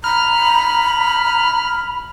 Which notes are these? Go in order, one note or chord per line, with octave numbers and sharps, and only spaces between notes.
A#5 B5 F6